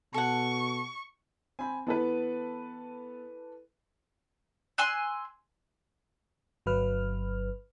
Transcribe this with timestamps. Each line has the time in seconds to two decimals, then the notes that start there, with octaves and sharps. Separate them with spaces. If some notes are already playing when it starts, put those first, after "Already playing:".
0.14 B2 A4 F#5 C#6
1.59 C4 G#5 B5
1.87 E3 B3 A4 B4
4.78 G#5 C6 E6 F#6
6.66 G1 F#3 B4 F6